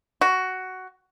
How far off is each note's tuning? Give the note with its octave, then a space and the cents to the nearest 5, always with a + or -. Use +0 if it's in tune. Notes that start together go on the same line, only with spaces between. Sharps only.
F#4 +10